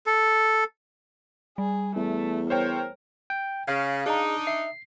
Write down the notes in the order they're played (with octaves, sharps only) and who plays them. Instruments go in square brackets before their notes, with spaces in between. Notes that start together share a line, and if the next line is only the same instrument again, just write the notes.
[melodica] A4
[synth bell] G3 [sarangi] G#4
[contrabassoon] E2 [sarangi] A3
[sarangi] A#4 [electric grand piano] C5 C#5 G5
[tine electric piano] G5
[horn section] C#3 [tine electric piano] F5
[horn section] D4 D#4 [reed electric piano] G#4 D#5 A#5
[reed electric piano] E5 [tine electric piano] C7